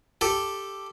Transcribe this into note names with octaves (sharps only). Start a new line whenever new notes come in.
G4 A4